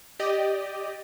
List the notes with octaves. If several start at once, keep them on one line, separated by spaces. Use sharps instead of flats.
G4 D5 D#5